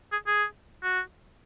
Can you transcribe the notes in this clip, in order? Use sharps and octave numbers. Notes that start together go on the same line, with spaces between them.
G#4
G#4
F#4